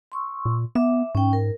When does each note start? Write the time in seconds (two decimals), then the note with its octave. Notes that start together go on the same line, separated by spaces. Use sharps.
0.12 C6 C#6 E6
0.45 A#2
0.75 B3 E5 D6
1.15 G#2 C#4 G5
1.33 A#4